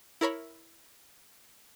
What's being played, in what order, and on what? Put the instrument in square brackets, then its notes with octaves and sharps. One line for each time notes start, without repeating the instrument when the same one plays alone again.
[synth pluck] E4 A#4 C#5 B5